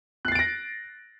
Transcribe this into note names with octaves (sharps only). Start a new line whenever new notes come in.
F#6 A6 A#6 C7 D7